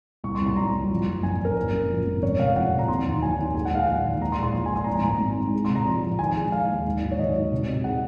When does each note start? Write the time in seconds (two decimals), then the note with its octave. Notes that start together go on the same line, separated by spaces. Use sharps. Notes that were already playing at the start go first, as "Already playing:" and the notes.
0.24 C2 C#6
0.35 C6
0.41 C2
0.46 C6
0.57 F#3 A#5
0.73 C2
0.90 F3
1.07 F#1
1.23 F#2 G#5
1.41 F#1 A#4
1.57 F#2
1.73 F#2
1.90 F3
2.06 G#1
2.22 F1 C#5
2.39 C3 F5
2.55 F2 F#5
2.73 C3
2.79 A#5
2.88 D#2 C6
3.06 D#3
3.22 F#3 G#5
3.38 D#2
3.55 G#3 G#5
3.65 F#5
3.71 G#3 F5
3.86 A#1 F#5
4.04 D#3
4.21 A#2 A#5
4.32 C6
4.37 G#3
4.43 C6
4.53 A#1
4.66 G#5
4.71 F3
4.76 C6
4.84 G#1 A#5
4.94 G#5
5.03 G#1 A#5
5.20 G#1
5.36 G#2
5.54 G#3
5.65 C6
5.70 C3
5.76 A#5
5.86 F3
6.03 F3
6.19 D#3 G#5
6.36 G#3
6.52 G#3 F5
6.69 D#2
6.86 G#2
7.02 F#3
7.11 C#5
7.18 D#3 D#5
7.35 F#3
7.52 C3
7.68 C3
7.84 G#3 F#5